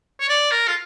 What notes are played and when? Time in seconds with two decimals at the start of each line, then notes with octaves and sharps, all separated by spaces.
0.20 C#5
0.29 D5
0.51 A#4
0.68 F4